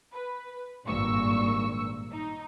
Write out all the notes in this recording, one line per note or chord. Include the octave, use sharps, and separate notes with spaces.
B4
G#1 G2 A#2 C#6 E6
D#4